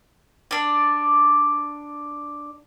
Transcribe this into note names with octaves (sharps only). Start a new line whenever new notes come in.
D4 D5